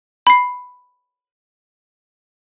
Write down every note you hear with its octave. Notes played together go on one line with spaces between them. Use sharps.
B5 C7